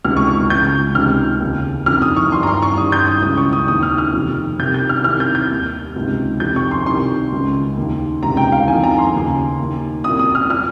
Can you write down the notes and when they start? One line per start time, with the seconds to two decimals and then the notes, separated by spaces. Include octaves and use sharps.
0.05 C#2 C3 D#3 F6
0.17 C#6
0.27 C#6
0.50 C#2 C#3 G6
0.95 C#2 C3 D#3 F6
1.41 D#2 C#3
1.86 F2 D#3 F6
2.02 D#6
2.16 C#6
2.31 G2 D#3 C6
2.43 A#5
2.47 C6
2.62 C#6
2.77 G2 D#3 D#6
2.92 G6
3.08 D#6
3.22 C#2 C#3 D#6
3.38 C#6
3.53 D#6
3.68 D#2 D#3 D#6
3.83 F6
3.98 F6
4.13 F2 C3 D#3
4.59 C2 C3 D#3 G6
4.74 G6
4.89 F6
5.04 C2 C3 D#3 F6
5.20 G6
5.35 G6
5.50 D#2 D#3
5.96 C#2 C3 D#3
6.40 F2 C3 D#3 G6
6.56 C#6
6.71 C6
6.86 C2 C3 D#3 C6
7.32 C#2 C#3
7.77 D#2 D#3
8.23 C#2 C3 D#3 A#5
8.37 G5
8.52 F5
8.68 F2 D#3 G#5
8.84 A#5
8.98 C6
9.13 D#2 C#3
9.59 D#2 D#3
10.04 C2 A#2 D#6
10.19 D#6
10.35 F6
10.50 A#2 F6